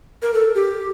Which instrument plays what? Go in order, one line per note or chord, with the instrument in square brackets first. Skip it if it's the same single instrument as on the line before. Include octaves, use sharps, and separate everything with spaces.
[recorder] A#4
A4
G4